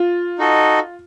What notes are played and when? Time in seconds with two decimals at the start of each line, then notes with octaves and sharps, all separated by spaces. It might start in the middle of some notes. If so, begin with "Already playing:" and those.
Already playing: F4
0.39 D#4 F#4 A4 D#5